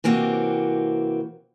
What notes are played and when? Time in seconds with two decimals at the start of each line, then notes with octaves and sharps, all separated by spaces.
0.04 C3 E3 A#3 C4 F#4 G4